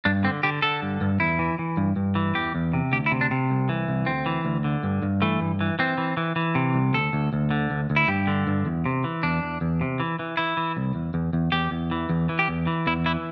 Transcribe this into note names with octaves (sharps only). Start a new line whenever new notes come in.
G2 D4
D3 C4
D3 G4
D3 A4
G2
G2
E2 E4
E3
E3
G2
G2
E3
E2 G4
E2
C3
D2 G4
E4
C3
D4
C3
C2
E3
C2
D2 C4
E3
D2
D3
G2
G2
E3 A3
G2
E3
E3 C4
E3
E3
E3
C3
C2
D2 A4
D2
D2
D3
D2
D2
E4
G2 G4
D3
G2
E2
C3
E3
E2 D4
E2
E2
C3
E3
E3
E3 E4
E3
C2
E2
E2
E2
E2 G4
E2
E3
E2
E3
G4
E2
E3
E2 E4
E3 E4